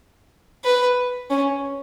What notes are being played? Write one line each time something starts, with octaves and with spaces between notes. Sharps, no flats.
B4
C#4